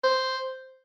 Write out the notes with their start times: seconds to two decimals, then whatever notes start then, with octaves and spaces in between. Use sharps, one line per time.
0.04 C5